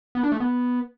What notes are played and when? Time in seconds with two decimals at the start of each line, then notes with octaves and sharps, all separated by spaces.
0.15 B3
0.23 D4
0.32 A3
0.40 B3